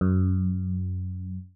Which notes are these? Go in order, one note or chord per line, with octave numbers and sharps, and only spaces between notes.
F#2